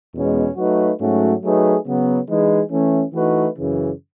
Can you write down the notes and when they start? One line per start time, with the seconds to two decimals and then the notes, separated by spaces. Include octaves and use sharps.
0.14 E2 B2 G#3 C#4
0.56 F#3 A3 D#4 F#4 B4
0.99 G#2 F#3 A3 C#4 F#4
1.42 F#3 A3 D#4 G#4 B4
1.85 C#3 F#3 B3
2.27 E3 G#3 D#4 G#4 B4
2.70 E3 A3 C#4
3.13 E3 A3 D#4 F#4 B4
3.55 F#2 C#3 E3